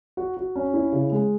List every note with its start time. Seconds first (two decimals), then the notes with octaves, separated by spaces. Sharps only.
0.17 F#4
0.37 F#4
0.56 C#4
0.74 E4
0.92 C#3
1.12 G#3